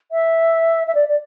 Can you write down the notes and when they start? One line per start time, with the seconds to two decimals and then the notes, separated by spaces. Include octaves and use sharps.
0.12 E5
0.87 E5
0.95 D5
1.09 D5